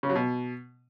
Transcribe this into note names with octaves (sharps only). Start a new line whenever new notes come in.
C#3
F#3
B2